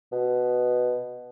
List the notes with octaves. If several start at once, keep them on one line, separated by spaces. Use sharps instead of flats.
B2